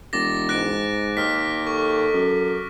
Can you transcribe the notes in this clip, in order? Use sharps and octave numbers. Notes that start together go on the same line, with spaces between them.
E1 D6 A6 A#6
G#2 F#6 A#6 D7
D#2 F6 B6
A4 C#6
F#2